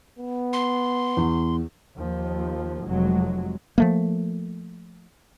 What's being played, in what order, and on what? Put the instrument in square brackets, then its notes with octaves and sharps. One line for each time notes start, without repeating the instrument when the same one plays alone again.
[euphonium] B3
[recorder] C6
[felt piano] E2
[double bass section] D#2 F3
F1 F#3 G#3
[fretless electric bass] F3 A3 A#3